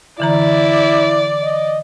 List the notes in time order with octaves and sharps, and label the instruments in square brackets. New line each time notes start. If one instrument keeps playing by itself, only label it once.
[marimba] D3 E3 A#5 [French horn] E4 [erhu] D5
[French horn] D#5